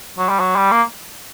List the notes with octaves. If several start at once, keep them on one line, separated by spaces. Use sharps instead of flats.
F#3
G3
F#3
G3
A#3